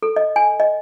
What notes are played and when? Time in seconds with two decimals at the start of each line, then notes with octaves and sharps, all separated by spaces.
0.03 A4
0.16 D#5
0.36 G#5
0.60 D#5